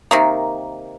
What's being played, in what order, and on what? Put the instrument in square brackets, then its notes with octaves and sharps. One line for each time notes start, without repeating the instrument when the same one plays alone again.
[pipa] C3 D#3 A#3